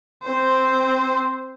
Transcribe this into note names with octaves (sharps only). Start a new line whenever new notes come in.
C4 C5